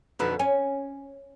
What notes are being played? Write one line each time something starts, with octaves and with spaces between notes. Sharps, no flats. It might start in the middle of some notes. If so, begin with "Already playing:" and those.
F2 B2 D3 D#4 B4
C#4 G#5